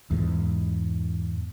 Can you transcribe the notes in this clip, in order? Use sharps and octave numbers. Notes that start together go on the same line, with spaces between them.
E2 G#2